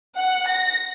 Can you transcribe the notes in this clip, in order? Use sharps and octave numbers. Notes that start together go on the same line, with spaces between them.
F#5
A#6